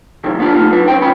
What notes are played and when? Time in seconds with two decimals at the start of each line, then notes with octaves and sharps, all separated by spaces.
0.24 C3 D#3 E3 F#3
0.39 A#3 B3 C#4 D4 F4
0.54 A3 D#4 F4
0.70 F#3 B4
0.88 C#4 C5 G5
1.00 C2 C#4 B5